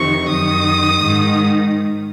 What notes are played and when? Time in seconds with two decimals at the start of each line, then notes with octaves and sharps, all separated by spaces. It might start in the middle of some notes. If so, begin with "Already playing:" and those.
Already playing: F2 C3 D#3 C#6
0.29 F#2 D#3 D#6
1.01 G#2 D#3